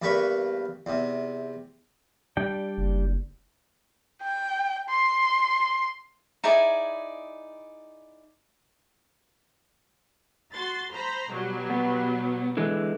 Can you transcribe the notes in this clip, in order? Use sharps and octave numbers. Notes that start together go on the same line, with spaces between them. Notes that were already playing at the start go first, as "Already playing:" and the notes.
E2 G2 A#3 B4 B5 C#6
E2 C3
G3 D4 G5
F#1
G5
C6
D#4 E4 G#4 D5
F#4 C6 A6
C5 A#5 B5
B2 F#3 G3
B3
D3 E3 G#3